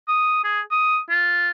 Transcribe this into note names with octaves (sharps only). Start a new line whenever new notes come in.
D#6
G#4
D#6
F4